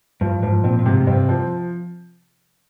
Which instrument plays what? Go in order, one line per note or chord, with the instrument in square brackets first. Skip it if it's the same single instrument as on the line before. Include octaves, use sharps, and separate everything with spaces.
[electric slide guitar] G2 [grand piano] F3
[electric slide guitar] G#2 [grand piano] F3
[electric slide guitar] A#2 [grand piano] C4
[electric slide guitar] A#2
[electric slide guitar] G#2 [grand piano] C3
[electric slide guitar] G#2
[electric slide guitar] G2 [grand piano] C4
[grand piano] F3